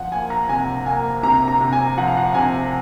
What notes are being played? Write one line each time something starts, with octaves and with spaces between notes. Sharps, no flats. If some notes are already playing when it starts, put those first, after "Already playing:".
Already playing: F3 F#5
A#3 G#5
A#5
C3 G#5
A#3 G#5
C3 A#5
A#5
C3
G#5
F3 F#5
F5
F#5
C3 G#5